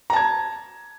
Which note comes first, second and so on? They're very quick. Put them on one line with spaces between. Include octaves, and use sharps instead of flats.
A#5 A5 G#6